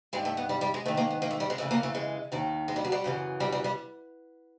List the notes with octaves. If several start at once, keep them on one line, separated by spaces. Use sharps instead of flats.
G2 D#3 G#3
A3
B3
G3
G3
G#3
G#2 D#3 A3
A#3
B3
A#3
A3
G3
G#3
F2 C#3 E3 A3
A#3
A3
G#3
D#2 D#3
G#3
G3
F#3
G3
F#2 C#3 E3
G3
G3
G3